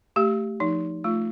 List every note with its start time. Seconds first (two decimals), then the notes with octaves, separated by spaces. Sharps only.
0.16 A3 G4
0.60 F3 D#4
1.04 A3 F4